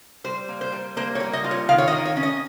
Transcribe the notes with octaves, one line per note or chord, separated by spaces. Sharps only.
G3 C5
A#3
C5
G3
A#3 C5
C#5
G3
D#5
F4
C#5
D#3 F5
C#5
D#5
D#3
C#5
C#4
D#5